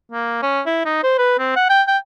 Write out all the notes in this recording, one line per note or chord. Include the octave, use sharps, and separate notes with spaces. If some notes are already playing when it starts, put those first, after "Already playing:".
A#3
C#4
E4
D#4
C5
B4
C4
F#5
G5
G5